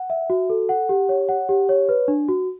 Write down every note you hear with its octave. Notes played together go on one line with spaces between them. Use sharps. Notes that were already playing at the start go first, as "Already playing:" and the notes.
Already playing: F#5
E5
F#4
A4
F#5
G4
C#5
F#5
G4
C#5
B4
D4
F#4